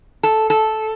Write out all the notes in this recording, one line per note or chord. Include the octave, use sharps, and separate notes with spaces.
A4
A4